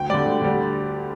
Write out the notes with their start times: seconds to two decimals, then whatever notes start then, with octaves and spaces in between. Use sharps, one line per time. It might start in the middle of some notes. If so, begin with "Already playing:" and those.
Already playing: D2 G5
0.09 D3 G3 D5
0.26 D2
0.42 D3 G3